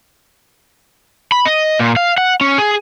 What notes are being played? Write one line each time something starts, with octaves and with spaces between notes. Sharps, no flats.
B5
D#5
A#2
F5
F#5
C#4
G#4